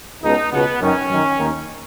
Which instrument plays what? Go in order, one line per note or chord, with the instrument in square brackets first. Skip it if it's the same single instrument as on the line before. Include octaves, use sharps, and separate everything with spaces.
[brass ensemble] C#2 B2 D#4
C#2 B2 B3
F#2 D#3 C#4
F#2 D#3
D#2 D#3